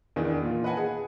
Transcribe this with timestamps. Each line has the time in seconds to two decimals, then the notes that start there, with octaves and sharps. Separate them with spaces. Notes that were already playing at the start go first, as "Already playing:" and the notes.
0.16 E2 D#3 E3 D4
0.42 A#2 F4
0.64 B4 D#5 F#5 G#5 A5
0.77 G#4